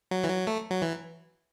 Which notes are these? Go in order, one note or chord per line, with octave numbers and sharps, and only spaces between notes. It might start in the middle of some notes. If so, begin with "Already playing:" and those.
F#3
E3
F#3
A3
F#3
E3